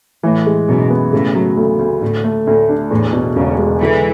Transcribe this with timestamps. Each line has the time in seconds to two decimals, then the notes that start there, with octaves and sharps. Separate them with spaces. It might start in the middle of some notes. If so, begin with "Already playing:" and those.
0.23 A2 E3
0.46 G#3
0.68 F#2 B2
0.90 B3
1.13 A2 C#3
1.35 F#3
1.57 D2
1.79 D2
2.02 A2 D3
2.24 A3
2.47 D2 A2
2.69 D4
2.91 E2 A2
3.13 B2
3.35 E1 C#3
3.58 G#3
3.81 D3 E3